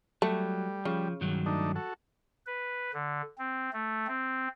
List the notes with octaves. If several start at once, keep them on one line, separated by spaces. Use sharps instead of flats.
F#3 G3 A3
C#3 F3
G2 D#3 F#3
A3 D4 D#4
F#4 A4
B4
D3
C4
A3
C4